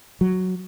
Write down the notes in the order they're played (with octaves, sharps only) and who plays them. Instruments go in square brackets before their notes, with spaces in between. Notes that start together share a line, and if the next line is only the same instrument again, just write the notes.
[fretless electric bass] F#3